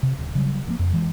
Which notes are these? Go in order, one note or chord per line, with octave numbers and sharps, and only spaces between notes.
C3
D1
C#3 F#3 G3
G2 F3 A#3
F2
E3 G#3